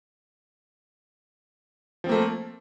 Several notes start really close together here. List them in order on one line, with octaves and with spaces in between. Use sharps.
F3 C4 A#3 A3